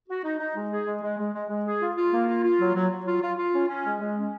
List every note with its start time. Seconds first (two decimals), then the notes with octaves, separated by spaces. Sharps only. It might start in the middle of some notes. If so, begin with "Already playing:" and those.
0.08 F#4
0.23 D#4
0.39 D#4
0.55 G#3
0.71 G#4
0.86 G#3
1.02 G#3
1.18 G#3
1.34 G#3
1.49 G#3
1.65 G#4
1.81 F4
1.96 F4
2.12 A#3
2.27 F4
2.43 F4
2.60 F#3
2.75 F#3
2.91 F#3
3.06 F4
3.21 F4
3.38 F4
3.54 C#4
3.69 C#4
3.85 G#3
4.00 G#3
4.16 C#4